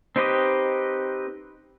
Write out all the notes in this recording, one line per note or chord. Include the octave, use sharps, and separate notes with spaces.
C4 D#4 G4 B4 D#5